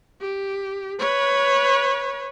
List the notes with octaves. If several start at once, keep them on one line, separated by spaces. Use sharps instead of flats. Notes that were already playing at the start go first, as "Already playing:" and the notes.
G4
B4 C#5